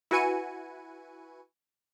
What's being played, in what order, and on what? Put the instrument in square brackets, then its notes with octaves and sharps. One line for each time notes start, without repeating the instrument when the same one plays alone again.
[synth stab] E4 F#4 B4 G#5 C#7 D#7